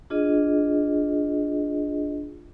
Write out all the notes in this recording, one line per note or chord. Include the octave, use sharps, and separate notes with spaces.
D4 F4 G#4 D#5